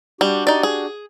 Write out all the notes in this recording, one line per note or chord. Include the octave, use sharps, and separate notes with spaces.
G3 D4 F#4 G4
D#4 D5
G#4